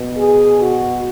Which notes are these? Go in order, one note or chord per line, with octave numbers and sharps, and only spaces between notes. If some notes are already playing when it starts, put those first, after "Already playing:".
Already playing: B2
G#4
F#4